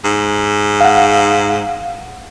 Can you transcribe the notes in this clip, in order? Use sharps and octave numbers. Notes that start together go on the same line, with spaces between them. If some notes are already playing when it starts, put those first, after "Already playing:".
G#2
F5 F#5